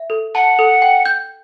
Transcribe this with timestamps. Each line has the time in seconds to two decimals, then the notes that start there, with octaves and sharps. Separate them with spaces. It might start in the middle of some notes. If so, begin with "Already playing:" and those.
Already playing: E5
0.10 A4
0.35 F#5 A5
0.59 A4
0.82 G5
1.05 G6